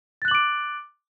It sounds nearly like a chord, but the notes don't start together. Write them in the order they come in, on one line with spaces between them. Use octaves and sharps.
A6 F#6 F#7 D6 D7